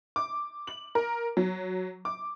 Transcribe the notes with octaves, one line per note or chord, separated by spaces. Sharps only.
D6
F#7
A#4
F#3
D6